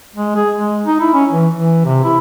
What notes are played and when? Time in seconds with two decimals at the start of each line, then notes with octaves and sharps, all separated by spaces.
0.16 G#3
0.36 G#4
0.56 G#3
0.86 D#4
1.01 E4
1.14 C#4
1.32 E3
1.53 E3
1.85 C3
2.04 E4